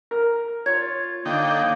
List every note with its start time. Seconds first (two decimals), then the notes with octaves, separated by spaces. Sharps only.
0.11 A#4
0.66 F4 C#5 G#6
1.25 D3 A#3 D#4 G5